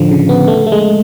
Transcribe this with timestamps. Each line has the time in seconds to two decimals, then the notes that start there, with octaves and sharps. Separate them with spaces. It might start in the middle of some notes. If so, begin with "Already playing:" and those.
Already playing: A2 D3 F3
0.11 C#3
0.29 B3
0.48 A3
0.66 A3
0.72 G#3